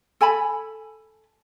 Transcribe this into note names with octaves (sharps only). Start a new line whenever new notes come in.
A4 G#5 A5 B5